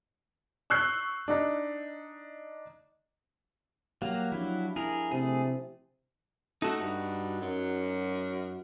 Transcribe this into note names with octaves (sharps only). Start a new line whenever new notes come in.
C#6 E6 F#6 G6 C7
D4 D#4
F#3 A#3 G4 F5
F3 F#3 D4 E4
E4 G#4 A#4
C3 A3 G#4
A3 D#4 F#4
G2
F#2